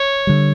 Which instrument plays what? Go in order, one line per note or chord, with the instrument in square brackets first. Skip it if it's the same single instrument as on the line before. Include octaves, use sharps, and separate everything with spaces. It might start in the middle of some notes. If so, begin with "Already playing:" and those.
Already playing: [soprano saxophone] C#5
[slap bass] D3 G3